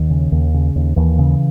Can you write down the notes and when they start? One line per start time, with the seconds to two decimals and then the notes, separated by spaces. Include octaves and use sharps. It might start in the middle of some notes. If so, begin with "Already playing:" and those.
Already playing: D#2 D#3
0.10 C#3
0.32 D#2
0.54 C#3
0.76 D#2
0.96 D#2 E3
1.19 C#3